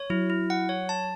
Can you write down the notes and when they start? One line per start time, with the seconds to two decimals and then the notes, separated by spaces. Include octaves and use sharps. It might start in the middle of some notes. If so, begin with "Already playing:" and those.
Already playing: C#5
0.10 F#3 E4
0.30 E4
0.50 F#5
0.69 C#5
0.89 A5